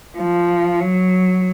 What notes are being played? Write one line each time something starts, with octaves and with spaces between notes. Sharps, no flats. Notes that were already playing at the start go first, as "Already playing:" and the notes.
F3
F#3